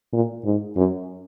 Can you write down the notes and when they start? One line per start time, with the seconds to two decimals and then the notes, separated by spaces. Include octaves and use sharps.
0.13 A#2
0.45 G#2
0.76 F#2